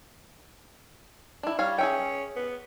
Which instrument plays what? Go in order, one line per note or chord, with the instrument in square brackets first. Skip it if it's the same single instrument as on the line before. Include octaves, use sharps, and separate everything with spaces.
[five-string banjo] D4 E4
G3 C#5 F5
[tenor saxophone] C#4 [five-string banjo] G#4 E5 G5
[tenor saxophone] B3